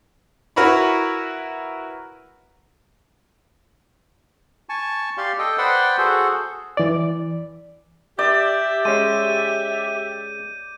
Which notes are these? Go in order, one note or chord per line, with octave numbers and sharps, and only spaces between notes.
E4 F#4 A#4 B4 C#5 B5
G#5 A5 C#6
G4 D5 F5 C6
A4 D#5 G5
B4 C5 D5 F#5 G5 C6
F#4 G#4 A4 C5
E3 D5
G4 D5 E5 G6
G#3 C#4 D#7